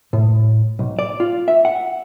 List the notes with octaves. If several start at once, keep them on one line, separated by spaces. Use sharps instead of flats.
A2
B1
D5
F4
E5
F#5